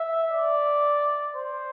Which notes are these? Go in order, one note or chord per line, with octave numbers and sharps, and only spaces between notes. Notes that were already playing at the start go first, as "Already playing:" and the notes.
Already playing: E5
D5
C5